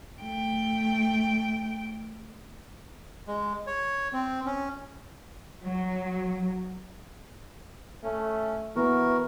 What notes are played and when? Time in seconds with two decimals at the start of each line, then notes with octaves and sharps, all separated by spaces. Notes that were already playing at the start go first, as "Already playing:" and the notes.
0.22 A3 G5
3.27 G#3
3.67 C#5
4.13 C4
4.46 C#4
5.65 F#3
8.03 A3 C#4
8.76 E3 B3 F#4 A#4